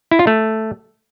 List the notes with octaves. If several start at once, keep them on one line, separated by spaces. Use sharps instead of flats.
E4
F4
A3